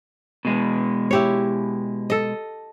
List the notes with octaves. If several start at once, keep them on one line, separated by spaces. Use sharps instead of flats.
B2 G#3
E4 G4 C#5
A4 D#5